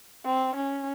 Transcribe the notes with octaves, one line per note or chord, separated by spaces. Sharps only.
C4
C#4